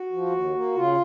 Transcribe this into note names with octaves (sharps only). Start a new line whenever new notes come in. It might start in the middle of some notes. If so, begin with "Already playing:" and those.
Already playing: F#4
F3
D#2
A#3
C#3 F4